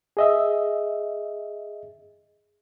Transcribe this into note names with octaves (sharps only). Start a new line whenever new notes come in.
G#4 D#5 E5